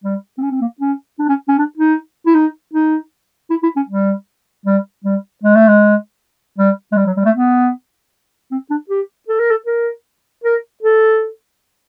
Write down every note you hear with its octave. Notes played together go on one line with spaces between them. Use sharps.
G3
C4
C#4
C4
A#3
C#4
D4
C#4
C#4
D4
D#4
E4
D#4
D#4
E4
E4
C#4
G3
G3
G3
G#3
A3
G#3
G3
G#3
G3
F#3
G3
A3
B3
C4
D4
G4
A4
A#4
A4
A#4
A#4
A4